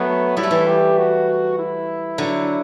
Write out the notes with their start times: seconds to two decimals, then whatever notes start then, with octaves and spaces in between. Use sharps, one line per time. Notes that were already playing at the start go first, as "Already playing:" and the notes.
Already playing: F#3 A3 B3
0.37 G3 E4
0.43 A3
0.51 E3 G3
0.67 G4
0.97 F#4
1.58 E4
2.18 D3 F#3